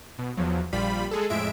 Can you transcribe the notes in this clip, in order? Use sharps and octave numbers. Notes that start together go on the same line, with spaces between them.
B2
E2 F3 F#3
A#1 G3 F4 B5
G#3 G#4 A4
F2 A2 G#3 E5 D7